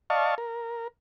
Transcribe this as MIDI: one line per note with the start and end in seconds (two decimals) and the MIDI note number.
0.10 0.35 74
0.10 0.35 75
0.10 0.35 77
0.10 0.35 81
0.10 0.35 85
0.38 0.88 70